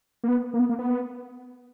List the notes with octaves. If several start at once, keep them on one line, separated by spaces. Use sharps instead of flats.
A#3
B3
A#3
B3
A#3
B3